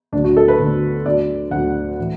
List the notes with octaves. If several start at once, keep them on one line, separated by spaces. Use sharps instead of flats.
D2 D3 F#3 D4
F#4
A4
B4
D2 D3 F#3
D2 D3 F#3 D5
D2 D3 F#3 F#5
A2 E3